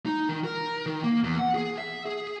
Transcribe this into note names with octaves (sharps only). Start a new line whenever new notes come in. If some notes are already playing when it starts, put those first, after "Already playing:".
D#4
D#3
A#4
D#3
A#3
E2
F#5
G#4
E5
G#4